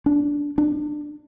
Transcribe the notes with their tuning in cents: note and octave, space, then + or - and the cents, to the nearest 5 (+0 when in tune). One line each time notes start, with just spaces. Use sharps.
D4 -10
D4 +25